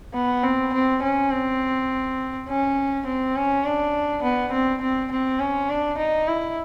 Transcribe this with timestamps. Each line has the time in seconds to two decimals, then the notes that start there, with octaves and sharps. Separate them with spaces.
0.14 B3
0.44 C4
0.74 C4
1.03 C#4
1.31 C4
2.49 C#4
3.06 C4
3.36 C#4
3.65 D4
4.23 B3
4.52 C4
4.82 C4
5.12 C4
5.40 C#4
5.69 D4
5.98 D#4
6.28 E4